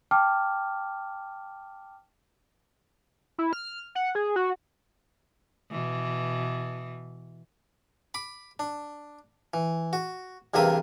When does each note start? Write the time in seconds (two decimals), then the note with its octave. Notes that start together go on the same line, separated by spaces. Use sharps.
0.11 G5 A5 D6 F6
3.38 E4
3.53 F6
3.95 F#5
4.15 G#4
4.36 F#4
5.71 B2 E3
8.14 B5 D6
8.59 D4
9.54 E3
9.93 F#4
10.54 E2 G2 C3 A#3 E5 D#6